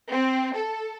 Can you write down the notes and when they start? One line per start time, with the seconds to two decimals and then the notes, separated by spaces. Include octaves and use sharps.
0.10 C4
0.56 A4